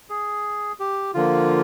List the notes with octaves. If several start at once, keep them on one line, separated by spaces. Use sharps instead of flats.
G#4
G4
D3 F3 A#3 F4